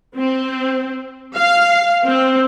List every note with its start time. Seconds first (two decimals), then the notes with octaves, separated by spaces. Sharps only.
0.16 C4
1.36 F5
2.05 C4